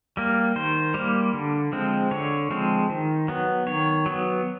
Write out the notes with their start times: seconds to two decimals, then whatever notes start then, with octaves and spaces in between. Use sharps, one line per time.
0.17 G3 A#3
0.56 D#3 C5
0.94 G3 A#3
1.34 D3
1.72 F3 G#3 C4
2.11 D3 C#5
2.51 F3 G#3 C4
2.90 D#3
3.28 F#3 B3
3.67 D#3 C#5
4.06 F#3 B3